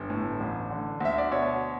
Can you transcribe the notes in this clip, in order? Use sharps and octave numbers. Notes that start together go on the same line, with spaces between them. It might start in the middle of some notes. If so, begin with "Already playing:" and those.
Already playing: G1
A2
A1
D3
D2 E5
D5
B2 C#5